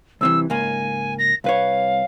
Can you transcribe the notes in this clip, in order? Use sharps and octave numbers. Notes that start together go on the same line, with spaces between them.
C2 C3 E3 E6
C#2 G#2 A#3 G#5
A#6
C2 B4 C#5 F5